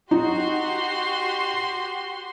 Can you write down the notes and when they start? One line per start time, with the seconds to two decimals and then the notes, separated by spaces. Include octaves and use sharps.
0.11 D#4 F#4 G4 C6